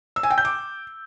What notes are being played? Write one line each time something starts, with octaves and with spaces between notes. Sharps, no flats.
E6
G#5
G5
G6
D6